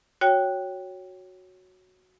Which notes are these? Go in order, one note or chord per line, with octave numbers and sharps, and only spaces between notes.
F#4 C#5 G5